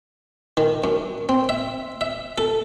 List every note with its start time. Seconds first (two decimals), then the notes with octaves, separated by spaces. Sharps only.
0.57 D#3
0.84 F#2
1.29 C4
1.49 E5
2.01 E5
2.38 A4